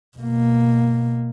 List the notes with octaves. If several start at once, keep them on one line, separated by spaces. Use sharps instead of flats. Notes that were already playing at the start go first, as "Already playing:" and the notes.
B2 A#3